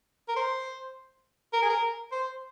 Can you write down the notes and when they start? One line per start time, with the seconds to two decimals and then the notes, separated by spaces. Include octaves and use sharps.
0.28 A#4
0.36 C5
1.53 A#4
1.62 G#4
1.70 A#4
2.12 C5